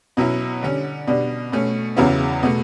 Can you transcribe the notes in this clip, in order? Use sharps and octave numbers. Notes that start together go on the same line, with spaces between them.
B2 F#3 C#4 E4
D3 G3 C#4
B2 G3 D4
B2 A3 C#4
E2 C#3 F#3 B3 E4
B2 A3